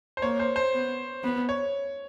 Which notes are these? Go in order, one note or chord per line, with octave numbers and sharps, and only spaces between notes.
C5
A#3 C#5
C5
C5
B3
B3
C#5